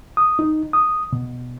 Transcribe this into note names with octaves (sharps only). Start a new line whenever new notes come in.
D#6
D#4
D#6
B2